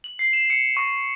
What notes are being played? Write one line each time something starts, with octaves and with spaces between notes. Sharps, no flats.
F#7
C7
E7
C#7
C#6